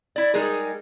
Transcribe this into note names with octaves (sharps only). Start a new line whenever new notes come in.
E4 D5
G3 G#3 D#4 G#4 A#4